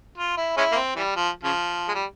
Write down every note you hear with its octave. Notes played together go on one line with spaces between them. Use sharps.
F4
E4
G#3 C#4 E4
A#3
C4
E3 G3
F3
C#3 F3
G#3
G3